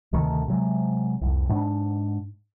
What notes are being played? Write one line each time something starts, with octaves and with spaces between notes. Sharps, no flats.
D2 C3 D#3 A3
C3 F#3 G#3
C2 F2
G#2 D4